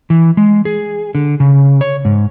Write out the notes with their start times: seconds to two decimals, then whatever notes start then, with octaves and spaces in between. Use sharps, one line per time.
0.10 E3
0.37 G#3
0.65 G#4
1.15 D3
1.40 C#3
1.81 C#5
2.05 G#2